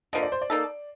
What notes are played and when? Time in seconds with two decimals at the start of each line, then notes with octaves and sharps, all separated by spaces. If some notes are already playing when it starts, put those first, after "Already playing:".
0.13 D3 F3 A#3 D#5
0.23 D5
0.32 C5
0.42 D5
0.50 A#3 D#4 A4